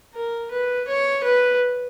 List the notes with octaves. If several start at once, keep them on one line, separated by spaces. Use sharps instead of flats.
A#4
B4
C#5
B4